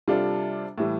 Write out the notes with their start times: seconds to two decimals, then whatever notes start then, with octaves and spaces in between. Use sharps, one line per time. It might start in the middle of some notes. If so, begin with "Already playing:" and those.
0.08 C3 G3 D4 F4 A4
0.78 A2 E3 G3